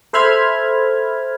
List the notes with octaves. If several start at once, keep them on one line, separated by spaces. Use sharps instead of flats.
A4 C5 E5 B5 F6 G#6